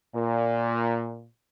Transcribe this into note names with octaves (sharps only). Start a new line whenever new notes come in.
A#2